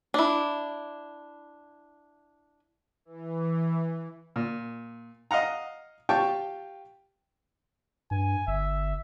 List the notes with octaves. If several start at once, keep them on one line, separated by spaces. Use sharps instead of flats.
D4 E4
E3
A#2
D#5 F5 F#5 A#5
F4 G4 G5 A5 C#6
G2 G#5
G1 E5